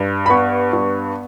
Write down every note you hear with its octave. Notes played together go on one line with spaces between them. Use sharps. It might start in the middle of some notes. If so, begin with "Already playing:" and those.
Already playing: G2
B5
B3 C#6
G2